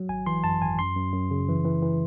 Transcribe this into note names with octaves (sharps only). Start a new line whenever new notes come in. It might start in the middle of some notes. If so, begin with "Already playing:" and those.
Already playing: F#3
G#1 G#5
E3 C6
F#2 A5
G#1 G#5
F#2 C6
F#2
F#2
C#3
E3
E3
E3